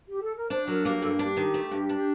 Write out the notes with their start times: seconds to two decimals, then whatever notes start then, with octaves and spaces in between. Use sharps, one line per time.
0.08 G4
0.22 A4
0.36 A#4
0.50 D4 C5
0.67 F#3 A#4
0.85 A#3 G4
1.02 G2 A4
1.15 A4
1.19 D4 G4
1.37 D#3
1.54 A3
1.71 G2
1.89 D4